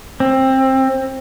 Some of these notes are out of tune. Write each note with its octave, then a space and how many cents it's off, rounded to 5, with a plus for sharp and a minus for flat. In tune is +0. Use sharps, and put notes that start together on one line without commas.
C4 +20